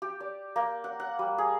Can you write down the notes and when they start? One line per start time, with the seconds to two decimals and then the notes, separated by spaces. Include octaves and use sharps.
0.02 G4
0.20 D5
0.56 A#3
0.84 F#5
1.00 F#5
1.19 G3
1.38 G#4